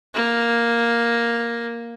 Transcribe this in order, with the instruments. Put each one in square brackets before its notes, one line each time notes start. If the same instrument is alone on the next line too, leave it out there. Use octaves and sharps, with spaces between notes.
[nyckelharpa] A#3